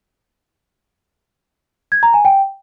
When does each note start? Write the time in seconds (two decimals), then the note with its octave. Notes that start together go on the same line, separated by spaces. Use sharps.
1.92 G#6
2.03 A#5
2.14 G#5
2.25 G5